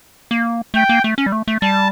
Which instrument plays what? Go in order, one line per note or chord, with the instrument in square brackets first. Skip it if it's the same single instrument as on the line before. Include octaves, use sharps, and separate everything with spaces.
[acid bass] A#3
[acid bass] A3 [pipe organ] G5
[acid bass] A#3
A3
C#4
G3
A3
A3
[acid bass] G3 [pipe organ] A5